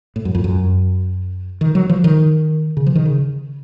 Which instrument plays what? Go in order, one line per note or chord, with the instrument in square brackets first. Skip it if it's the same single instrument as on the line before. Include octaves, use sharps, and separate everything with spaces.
[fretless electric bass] A2
F#2
F2
F#2
D#3
F#3
F3
D#3
C#3
F3
D#3
C#3